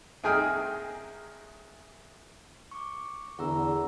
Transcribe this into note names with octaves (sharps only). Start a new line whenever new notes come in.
C2 D#4 G#4 G5 G#5 F6
C#6 D6
E2 D3 F#5 A#5 E6